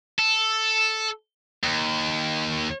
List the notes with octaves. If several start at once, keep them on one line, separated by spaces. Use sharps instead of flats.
A4
D#2